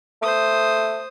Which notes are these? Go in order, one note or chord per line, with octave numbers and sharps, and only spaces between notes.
A3 C5 D#6